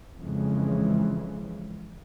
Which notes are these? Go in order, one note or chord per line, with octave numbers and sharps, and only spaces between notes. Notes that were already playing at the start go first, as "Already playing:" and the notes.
F2 C#3 E3 G#3